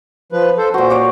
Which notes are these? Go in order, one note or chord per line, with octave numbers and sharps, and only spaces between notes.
F3 B4
A4 C5
A#2 F#4 C5
C#5 F#5 D6